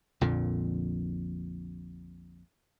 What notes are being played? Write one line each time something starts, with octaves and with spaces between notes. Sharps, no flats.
A#1 F2 A#2 D3